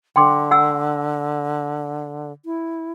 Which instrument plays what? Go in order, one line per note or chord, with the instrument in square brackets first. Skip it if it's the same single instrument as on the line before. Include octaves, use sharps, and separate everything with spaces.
[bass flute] D3 [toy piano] G5 C6 D6
[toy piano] F#5 G#5 E6
[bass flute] E4